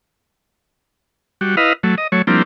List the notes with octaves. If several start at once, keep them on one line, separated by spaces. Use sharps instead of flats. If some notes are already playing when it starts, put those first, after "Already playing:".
G3 F#4
E4 B4 D#5 F5
F#3 A3
D#5
F#3 A3 C#5
F3 G3 A#3 C4 D4 E4